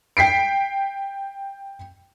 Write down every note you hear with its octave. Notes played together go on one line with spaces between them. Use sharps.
G5 B6 C7 D7